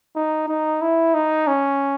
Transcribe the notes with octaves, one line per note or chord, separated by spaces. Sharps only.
D#4
D#4
E4
D#4
C#4